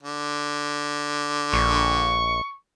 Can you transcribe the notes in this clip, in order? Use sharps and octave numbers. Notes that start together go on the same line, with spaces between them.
D3
A#1 C#6